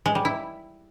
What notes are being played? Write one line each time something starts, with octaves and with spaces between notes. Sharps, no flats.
G#3
G3
E4